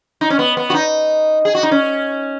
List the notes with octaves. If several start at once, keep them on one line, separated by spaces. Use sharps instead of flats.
D#4
C#4
B3
B3
F#4
D#4
G#4
F#4
D#4
C#4